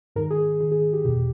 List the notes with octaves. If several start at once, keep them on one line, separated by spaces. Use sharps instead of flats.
G#2 D#3 A#4
G#4
G#2 D#3 G#4
G#4
G#4
G4
E2 B2 G4